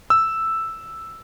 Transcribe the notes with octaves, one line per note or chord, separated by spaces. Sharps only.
E6